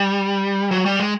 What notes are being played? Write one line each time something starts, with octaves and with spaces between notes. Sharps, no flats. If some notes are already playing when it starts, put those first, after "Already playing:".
Already playing: G3
F#3
G3
G#3